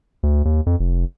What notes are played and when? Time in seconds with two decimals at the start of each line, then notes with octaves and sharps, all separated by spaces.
0.23 D2
0.45 D#2
0.66 F2
0.79 F1